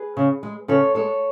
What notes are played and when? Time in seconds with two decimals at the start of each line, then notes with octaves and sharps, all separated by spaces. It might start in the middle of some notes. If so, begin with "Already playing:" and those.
Already playing: G#4 B4
0.17 C#3
0.43 G#3
0.68 C#3 A4 C#5
0.95 G#3 A4 C#5